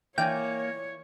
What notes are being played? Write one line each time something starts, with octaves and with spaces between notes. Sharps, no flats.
E3 A#3 C#5 D5 G5 G#5